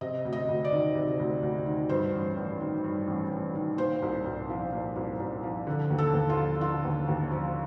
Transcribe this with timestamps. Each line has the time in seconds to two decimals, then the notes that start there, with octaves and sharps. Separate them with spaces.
0.01 C3 D#5
0.25 D2
0.33 D#5
0.49 D2
0.64 D5
0.72 D#3
0.95 C3
1.19 D2
1.43 D2
1.66 D#3
1.89 G2 C5
2.14 A1
2.37 A1
2.60 D#3
2.84 G2
3.08 A1
3.31 A1
3.55 D#3
3.78 A#2 C5
4.02 C2
4.25 C2
4.50 F3
4.73 A#2
4.96 C2
5.20 C2
5.43 F3
5.67 D3
5.90 D#2
5.98 A4
6.14 D#2
6.29 F4
6.38 F3
6.61 D3 F4
6.85 D#2
7.08 D#2
7.32 F3